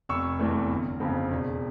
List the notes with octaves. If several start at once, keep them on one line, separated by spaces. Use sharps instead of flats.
F1 C#6 E6
E2 E3 A3
G1
F2 C#3 F3
E1